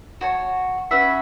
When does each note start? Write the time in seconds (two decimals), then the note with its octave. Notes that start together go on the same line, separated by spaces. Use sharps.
0.21 F#4 C#5 A5
0.91 C#4 F#4 B4 E5